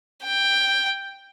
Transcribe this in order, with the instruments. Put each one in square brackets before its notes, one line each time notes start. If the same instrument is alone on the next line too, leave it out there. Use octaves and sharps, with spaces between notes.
[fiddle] G5